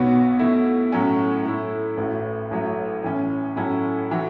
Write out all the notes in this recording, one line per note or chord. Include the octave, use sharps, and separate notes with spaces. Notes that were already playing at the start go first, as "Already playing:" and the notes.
Already playing: B1 B2 B3 F#4 C#5
B2 A3 E4
A2 F#3 A3 C#4
A2 A3 E4
A1 A2 A3 F#4
A1 A2 F#3 A3
A2 E3 C#4
A2 F#3 C#4 E4 A4
E3 A3 F#4